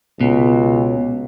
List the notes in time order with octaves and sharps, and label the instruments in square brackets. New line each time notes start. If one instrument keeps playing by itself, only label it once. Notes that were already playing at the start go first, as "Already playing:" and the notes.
[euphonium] C#2 [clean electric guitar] B2